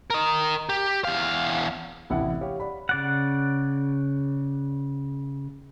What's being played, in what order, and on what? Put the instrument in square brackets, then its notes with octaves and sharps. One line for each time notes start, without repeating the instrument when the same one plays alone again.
[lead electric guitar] A#4 D#5
G4
E2 F5
[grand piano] A1 C3 E4 F#5
G4 C#5 F5
D5 F#5 B5
[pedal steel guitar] C#3 D5 F#5